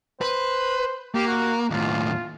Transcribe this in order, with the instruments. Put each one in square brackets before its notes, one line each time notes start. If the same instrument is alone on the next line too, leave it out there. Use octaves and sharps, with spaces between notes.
[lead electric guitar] B4 [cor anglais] C5
[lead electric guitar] A#3 [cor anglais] G4
[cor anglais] F#4
[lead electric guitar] D#2 A2 [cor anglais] F4